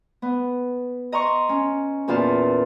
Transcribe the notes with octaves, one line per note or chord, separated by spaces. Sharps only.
B3
D#5 A#5 C6 C#6
C#4
E2 A#2 F4 A5